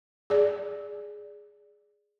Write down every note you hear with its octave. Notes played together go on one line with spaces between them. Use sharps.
G#4 D5